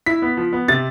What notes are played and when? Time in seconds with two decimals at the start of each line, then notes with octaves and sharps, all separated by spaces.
0.06 E4 B6
0.22 B3
0.37 F3
0.53 B3
0.68 C3 A6